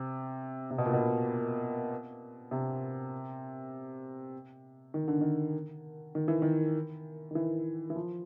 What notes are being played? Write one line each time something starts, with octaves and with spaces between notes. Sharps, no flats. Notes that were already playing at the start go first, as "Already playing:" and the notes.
Already playing: C3
C3
B2
A#2
B2
C3
D#3
D3
D#3
D#3
E3
D#3
D#3
E3
E3
F3